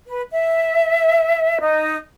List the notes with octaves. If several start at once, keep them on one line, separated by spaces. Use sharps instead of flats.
B4
E5
D#4